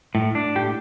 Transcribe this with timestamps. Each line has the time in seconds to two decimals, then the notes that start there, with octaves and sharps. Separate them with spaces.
0.15 A2
0.35 D4
0.56 A2 G4